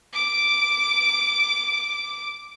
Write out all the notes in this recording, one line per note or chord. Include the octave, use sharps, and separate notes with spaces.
D6 D7